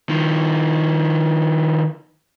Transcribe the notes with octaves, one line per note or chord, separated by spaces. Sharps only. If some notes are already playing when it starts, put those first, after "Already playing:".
D#3 F3